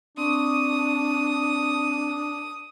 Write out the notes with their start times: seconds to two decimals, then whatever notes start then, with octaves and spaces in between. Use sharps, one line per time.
0.17 C4 D4 C#6 D#6